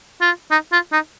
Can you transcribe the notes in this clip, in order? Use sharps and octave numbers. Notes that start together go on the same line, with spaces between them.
F4
D#4
F4
D#4